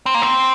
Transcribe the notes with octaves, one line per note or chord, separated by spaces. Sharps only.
C4
A#3
C4